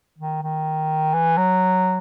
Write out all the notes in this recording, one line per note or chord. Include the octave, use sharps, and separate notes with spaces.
D#3
D#3
E3
F#3